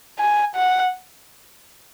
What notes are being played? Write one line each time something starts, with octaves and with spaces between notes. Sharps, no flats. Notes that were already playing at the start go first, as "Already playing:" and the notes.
G#5
F#5